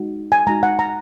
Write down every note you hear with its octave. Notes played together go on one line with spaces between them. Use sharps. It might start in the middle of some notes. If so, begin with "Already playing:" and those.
Already playing: G#3 D#4 F#4
G#5
G#3 D#4 F#4 A#5
F#5
A#5